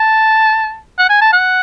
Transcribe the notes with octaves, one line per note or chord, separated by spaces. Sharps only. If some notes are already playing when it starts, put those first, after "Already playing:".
Already playing: A5
F#5
G#5
A5
F#5